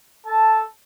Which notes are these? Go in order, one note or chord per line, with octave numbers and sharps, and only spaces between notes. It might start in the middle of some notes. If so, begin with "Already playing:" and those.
A4 A5